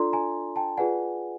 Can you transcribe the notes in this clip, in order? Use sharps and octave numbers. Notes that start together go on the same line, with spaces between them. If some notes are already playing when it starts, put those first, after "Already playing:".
Already playing: D4 F4 A4 D5 A#5 C6
G#5 A#5
G5 A5
F4 G#4 B4 D5 F#5 G#5